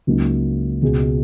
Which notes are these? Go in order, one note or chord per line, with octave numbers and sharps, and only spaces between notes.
C#2 C#3 F#3 A#3 D#4
C#2 B2 G#3